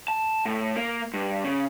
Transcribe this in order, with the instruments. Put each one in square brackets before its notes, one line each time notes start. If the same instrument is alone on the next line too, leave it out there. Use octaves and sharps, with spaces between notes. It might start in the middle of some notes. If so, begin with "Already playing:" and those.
[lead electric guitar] A5
A2
A#3
G2
C#3